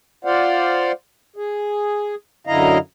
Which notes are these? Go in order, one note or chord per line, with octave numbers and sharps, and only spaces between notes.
F4 C5 D5 F5 F#5
G#4
F#2 D3 E4 D#5 F5 A#5